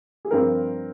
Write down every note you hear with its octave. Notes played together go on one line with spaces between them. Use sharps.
G#4
G2 F3 C4 A#4